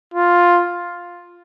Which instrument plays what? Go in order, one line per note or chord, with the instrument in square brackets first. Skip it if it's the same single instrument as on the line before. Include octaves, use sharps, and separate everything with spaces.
[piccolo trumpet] F4